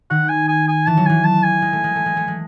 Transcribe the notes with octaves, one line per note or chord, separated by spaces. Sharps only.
D#3 F#5
G#5
G#5
G#5
E3 A5
F#3
E3 G#5
A5
G#5
G#3
A3
G#3
A3
G#3
A3
G#3